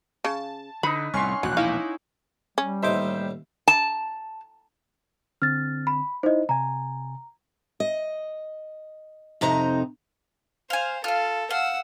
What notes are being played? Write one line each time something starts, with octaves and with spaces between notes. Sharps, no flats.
C#3 A5
D3 D#4 B4 B5
C2 A2 C#4 F#5 C6 C#6 F6
E1 A#1 E2 F#3 F#6
D#4 E4 F5 D6
G3 C#4
A1 D#2 D#4 C5 E5 D6
A5
D3 C4 F6 A6
B5
D#4 E4 C5 D#5
C3 G#5 A#5
D#5
F2 C3 D#4 A#5
C5 F5 G#5
F4 A4 F5
F5 F#5 E6